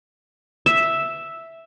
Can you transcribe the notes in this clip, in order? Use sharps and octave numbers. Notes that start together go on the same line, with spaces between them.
E5